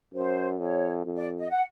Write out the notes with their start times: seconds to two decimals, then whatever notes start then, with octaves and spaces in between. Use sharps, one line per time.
0.14 F#2 C5
0.59 F2 C#5
1.05 F2
1.16 D5
1.38 D#5
1.50 F#5